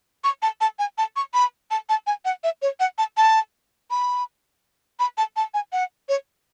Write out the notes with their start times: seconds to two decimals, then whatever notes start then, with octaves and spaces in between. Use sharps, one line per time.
0.24 C#6
0.42 A5
0.61 A5
0.79 G#5
0.98 A5
1.16 C#6
1.34 B5
1.71 A5
1.89 A5
2.07 G#5
2.25 F#5
2.44 E5
2.62 C#5
2.80 F#5
2.98 A5
3.17 A5
3.91 B5
5.00 B5
5.18 A5
5.36 A5
5.54 G#5
5.73 F#5
6.09 C#5